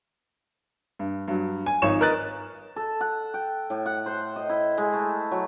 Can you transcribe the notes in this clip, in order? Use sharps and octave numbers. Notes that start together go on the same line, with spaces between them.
G2
G2 F#3
G#5
G#1 F3 D#4 C#5 C#6 E7
A#4 B4 D#5 F#6 A6
A4
F#5
G5
A2
F#5
C5
D#5
E4
G#3
A3
F#3